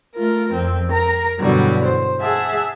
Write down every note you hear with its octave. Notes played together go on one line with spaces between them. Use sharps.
A3 F4 A#4
F2 C4
A#4 A#5
G2 B2 D3 E3 F#3 G3
C5
G#4 E5 F#5 A5